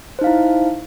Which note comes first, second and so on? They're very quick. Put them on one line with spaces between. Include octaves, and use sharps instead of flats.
C5 D#4 F5 E4